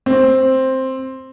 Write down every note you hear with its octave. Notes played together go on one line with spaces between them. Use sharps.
C4